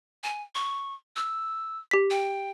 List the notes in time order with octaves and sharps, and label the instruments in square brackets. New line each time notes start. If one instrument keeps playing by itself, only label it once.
[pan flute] G#5
C#6
E6
[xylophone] G4 B6
[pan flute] G5